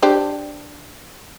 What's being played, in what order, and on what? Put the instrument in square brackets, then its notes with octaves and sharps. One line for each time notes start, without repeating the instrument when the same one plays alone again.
[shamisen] D4 G4 C5